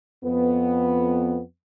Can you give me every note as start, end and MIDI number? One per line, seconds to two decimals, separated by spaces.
0.25 1.40 41
0.25 1.40 59